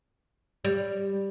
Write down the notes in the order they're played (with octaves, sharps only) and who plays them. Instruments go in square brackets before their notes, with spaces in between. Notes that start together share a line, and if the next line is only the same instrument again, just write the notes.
[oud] G3